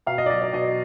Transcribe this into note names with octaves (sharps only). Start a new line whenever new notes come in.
B2 F5
D#5
D5
F#3 D#5
D5
B2 D#5